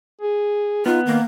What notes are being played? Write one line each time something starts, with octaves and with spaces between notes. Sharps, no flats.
G#4
B3 D#4 F4
D#3 A#3